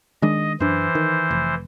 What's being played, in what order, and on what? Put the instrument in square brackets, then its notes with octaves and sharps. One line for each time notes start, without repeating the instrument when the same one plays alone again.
[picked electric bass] D#3 G#3 D4 [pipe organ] D#5
[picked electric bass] F#2 D4 [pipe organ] E3 C5
[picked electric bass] D#3
F1